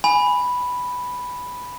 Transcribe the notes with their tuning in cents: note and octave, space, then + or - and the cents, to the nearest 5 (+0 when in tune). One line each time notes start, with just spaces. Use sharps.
G#5 +0 B5 +0